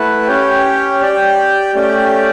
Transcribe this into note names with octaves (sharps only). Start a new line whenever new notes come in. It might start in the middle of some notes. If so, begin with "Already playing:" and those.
Already playing: A3 E4 B4 F#5 A5
C#4 G4 C#5 G5
G4 D5 G5
A3 C#4 G4 D5 G5